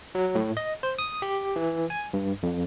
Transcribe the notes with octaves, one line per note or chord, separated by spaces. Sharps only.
F#3
A2
D#5
C5
D#6
G4
E3
G#5
G2
F2